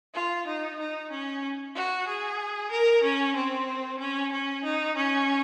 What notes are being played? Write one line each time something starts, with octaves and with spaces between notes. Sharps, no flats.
F4
D#4
D#4
C#4
F#4
G#4
A#4
C#4
C4
C#4
C#4
D#4
C#4